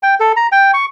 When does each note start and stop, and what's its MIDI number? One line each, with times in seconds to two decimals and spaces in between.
0.03 0.15 79
0.20 0.32 69
0.36 0.47 82
0.52 0.71 79
0.74 0.85 85